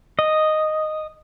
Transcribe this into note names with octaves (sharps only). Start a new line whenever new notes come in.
D#5